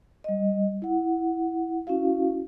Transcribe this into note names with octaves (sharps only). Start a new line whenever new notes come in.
G3 D#5
E4 F#5
C#4 E4 F#4 F5